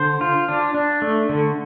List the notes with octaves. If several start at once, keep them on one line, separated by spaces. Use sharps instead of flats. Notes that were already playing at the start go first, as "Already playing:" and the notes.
Already playing: D3 C5
F4
D4
D4
A3
D3